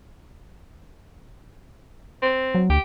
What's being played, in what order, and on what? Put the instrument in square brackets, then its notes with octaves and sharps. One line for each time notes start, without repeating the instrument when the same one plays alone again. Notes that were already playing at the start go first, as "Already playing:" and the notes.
[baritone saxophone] C4
[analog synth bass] F#3
[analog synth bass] D2 [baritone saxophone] G4